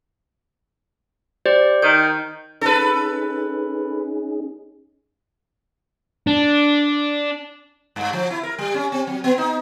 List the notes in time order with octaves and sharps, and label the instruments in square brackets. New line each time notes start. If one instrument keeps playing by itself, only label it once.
[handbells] G4 C5 D5
[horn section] D#3 [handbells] G6
[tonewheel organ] C#4 D#4 G#4 [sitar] A4 B4
[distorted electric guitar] D4
[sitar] G2
F3
E4
A#4
G3
C#4
C4
F#3
B3
D#4